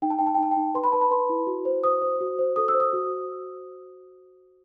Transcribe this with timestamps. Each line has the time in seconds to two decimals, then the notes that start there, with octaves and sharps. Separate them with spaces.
0.02 D#4 G5
0.10 A5
0.19 D#4 G5
0.26 A5
0.35 G5
0.38 D#4 A5
0.51 G5
0.57 D#4
0.75 B4 C6
0.84 B5
0.92 B4 A5
1.01 B5
1.11 B4 C6
1.29 E4
1.47 F#4
1.65 C5
1.84 C5 D#6
2.02 C5
2.21 F#4
2.39 C5
2.56 A4 D#6
2.68 E6
2.74 C5
2.80 D#6
2.93 F#4